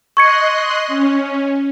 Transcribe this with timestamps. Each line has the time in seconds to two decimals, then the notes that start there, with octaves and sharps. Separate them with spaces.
0.17 D#5 C6 C#6 F#6 G#6 C#7
0.88 C#4